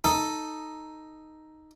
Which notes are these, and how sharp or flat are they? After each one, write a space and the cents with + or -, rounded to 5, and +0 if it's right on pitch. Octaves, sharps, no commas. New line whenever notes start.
D#4 +0 A4 +0